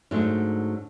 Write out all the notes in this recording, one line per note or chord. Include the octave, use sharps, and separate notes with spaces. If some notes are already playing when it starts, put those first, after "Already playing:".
G#2 D3 F#3 A3 D4